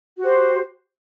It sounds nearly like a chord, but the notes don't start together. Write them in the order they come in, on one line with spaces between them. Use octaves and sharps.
F#4 G4 C5